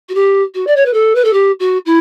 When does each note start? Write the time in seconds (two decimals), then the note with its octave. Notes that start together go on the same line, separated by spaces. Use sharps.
0.09 F#4
0.14 G4
0.54 F#4
0.67 D5
0.76 C#5
0.85 B4
0.93 A4
1.15 B4
1.24 A4
1.33 G4
1.59 F#4
1.86 E4